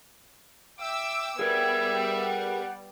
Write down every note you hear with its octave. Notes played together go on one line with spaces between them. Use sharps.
E5 G5 D6 E6
G3 B3 G#4 A#4 E5 G#6
F#5